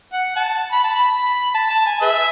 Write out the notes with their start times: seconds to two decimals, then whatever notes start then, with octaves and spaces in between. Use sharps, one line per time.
0.13 F#5
0.36 F#5 A5
0.72 B5
0.84 A5
0.95 B5
1.55 A5
1.70 A5
1.86 G#5
2.02 G#4 B4 E5